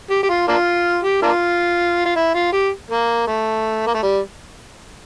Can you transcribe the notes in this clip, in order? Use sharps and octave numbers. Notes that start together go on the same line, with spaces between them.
G4
G4
F4
A#3 D4 F4
G4
A#3 D4 F4
F4
E4
F4
G4
A#3
A3
A#3
A3
G3